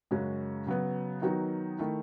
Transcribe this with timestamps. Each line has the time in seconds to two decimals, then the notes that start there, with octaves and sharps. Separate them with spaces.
0.11 F#2 C#3 G#3 C#4 F#4
0.67 C#3 F#3 B3
1.22 D#3 F#3 B3 D#4 F#4
1.78 D#3 A3 E4